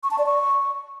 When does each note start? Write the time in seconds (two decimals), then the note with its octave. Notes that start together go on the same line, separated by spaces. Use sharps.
0.03 C#6
0.11 A5
0.18 D5
0.26 C#6